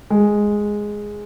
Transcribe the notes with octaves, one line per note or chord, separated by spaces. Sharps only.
G#3